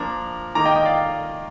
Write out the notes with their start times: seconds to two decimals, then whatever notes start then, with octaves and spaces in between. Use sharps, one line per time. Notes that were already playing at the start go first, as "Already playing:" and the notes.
Already playing: F3 A#3 D4 A#5
0.55 D#3 A#3 D#4 A#5 D6
0.65 D#5 G5
0.75 D#5 G5
0.85 D5 F5